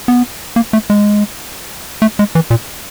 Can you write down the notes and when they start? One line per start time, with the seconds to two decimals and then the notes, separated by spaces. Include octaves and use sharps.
0.08 B3
0.56 A#3
0.73 A3
0.90 G#3
2.02 A3
2.19 G#3
2.35 E3
2.50 A#2